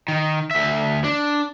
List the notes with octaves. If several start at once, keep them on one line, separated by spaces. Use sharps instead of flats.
D#3
D2 E5
D4